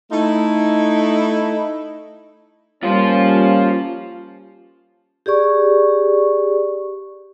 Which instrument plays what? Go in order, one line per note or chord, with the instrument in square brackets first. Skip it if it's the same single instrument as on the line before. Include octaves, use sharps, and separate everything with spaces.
[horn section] A3 D#4 E4
[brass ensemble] G3 A#3 C#4 [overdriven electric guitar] F4 C5
[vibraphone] G4 G#4 D5 C#6